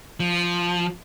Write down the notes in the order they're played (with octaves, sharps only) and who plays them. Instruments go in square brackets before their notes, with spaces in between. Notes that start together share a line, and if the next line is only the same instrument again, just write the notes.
[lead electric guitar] F3